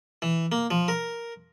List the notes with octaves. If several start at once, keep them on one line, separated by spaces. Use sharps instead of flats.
E3
A#3
F3
A#4